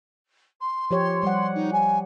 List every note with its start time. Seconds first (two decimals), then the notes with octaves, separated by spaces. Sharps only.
0.60 C6
0.91 F3 G4 C#5
1.23 G3 F#5
1.55 D#4
1.72 G#5